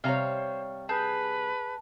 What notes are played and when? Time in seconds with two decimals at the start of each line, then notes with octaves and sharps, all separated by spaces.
0.04 C3 G3 C5 C#5 F5 A#5
0.89 G#4 B4 A5 G6